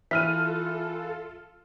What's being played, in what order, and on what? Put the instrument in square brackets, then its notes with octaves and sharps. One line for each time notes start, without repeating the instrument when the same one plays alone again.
[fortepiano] E3 [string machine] F4 A4 [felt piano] E5 F6 D#7 [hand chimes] B6